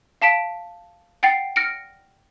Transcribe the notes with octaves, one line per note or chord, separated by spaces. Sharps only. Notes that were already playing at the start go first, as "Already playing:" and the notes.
F5 A5 B6 D7
F#5 G5 A6 C7
F6 A#6 C#7 D7